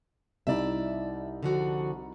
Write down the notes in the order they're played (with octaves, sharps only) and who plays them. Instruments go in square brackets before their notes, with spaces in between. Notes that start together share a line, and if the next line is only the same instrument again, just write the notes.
[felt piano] C2 D#4 E4 [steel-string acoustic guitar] D5 E5
[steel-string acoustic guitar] D3 F3 F#4